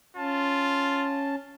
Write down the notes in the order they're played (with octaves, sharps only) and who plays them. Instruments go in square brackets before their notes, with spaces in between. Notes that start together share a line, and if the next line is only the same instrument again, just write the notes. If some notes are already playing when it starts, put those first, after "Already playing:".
[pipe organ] C#4 A5 [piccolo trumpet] F4